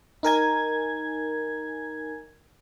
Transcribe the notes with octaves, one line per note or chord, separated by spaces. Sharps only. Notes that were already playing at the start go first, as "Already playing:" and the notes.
D#4 A#4 G#5 G#6